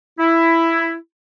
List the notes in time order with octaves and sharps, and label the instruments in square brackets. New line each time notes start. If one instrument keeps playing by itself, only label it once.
[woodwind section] E4